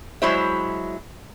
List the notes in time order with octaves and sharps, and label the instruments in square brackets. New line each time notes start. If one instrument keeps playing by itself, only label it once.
[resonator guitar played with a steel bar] F#3 G#3 E4 C5 E5